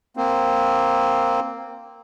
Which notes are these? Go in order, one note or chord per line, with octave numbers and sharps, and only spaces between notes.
A#3 C4